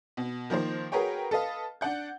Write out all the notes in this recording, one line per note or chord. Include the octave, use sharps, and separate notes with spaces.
B2
D#3 F3 A#3 C5
F#4 G#4 A#4 B4 C#5 G5
A4 B4 D#5 F5
D4 D5 F#5 G6